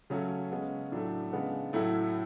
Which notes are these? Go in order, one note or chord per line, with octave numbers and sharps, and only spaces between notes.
C#3 F#3 A3 C#4
C#3 G#3 B3
A2 F#3 A3 D4
C#3 G#3 B3
A2 F#3 A3 E4